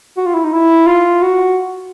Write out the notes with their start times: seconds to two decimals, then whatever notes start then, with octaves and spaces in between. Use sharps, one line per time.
0.17 F#4
0.26 F4
0.35 E4
0.44 D#4
0.52 E4
0.87 F4
1.22 F#4